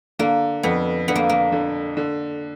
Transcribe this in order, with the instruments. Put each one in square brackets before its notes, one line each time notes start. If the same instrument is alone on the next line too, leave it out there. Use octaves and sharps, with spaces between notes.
[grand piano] D3 [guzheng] A#3
[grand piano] F2 [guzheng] B3
[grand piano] D3 [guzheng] B3
[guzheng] A#3
A#3
[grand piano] D3
D3